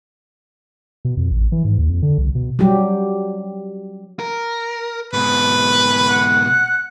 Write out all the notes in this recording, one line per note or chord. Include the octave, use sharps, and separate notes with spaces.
B2
F2
A1
E3
G#2
D#2
F2
D3
C2
B2
F#3 G3 G4
A#4
G#2 B2 B4
F#5 F#6